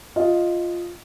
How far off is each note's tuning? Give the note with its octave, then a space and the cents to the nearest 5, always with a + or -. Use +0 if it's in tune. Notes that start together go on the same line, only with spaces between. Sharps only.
F4 +0 D#5 +0